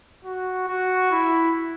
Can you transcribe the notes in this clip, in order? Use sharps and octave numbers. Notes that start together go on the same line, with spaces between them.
F#4
F#4
E4